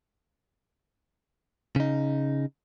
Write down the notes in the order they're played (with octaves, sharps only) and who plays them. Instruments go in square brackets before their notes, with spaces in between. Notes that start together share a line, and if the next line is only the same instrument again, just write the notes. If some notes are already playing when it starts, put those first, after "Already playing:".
[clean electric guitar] C#3 D#4